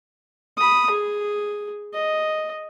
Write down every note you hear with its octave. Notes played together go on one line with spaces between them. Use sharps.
B5 D#6
G#4
D#5